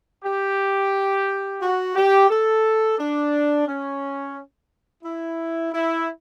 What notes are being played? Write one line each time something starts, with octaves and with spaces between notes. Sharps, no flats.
G4
F#4
G4
A4
D4
C#4
E4
E4